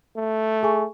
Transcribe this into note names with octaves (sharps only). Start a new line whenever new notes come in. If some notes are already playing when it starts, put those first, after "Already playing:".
A3
G#4 G#5 C#6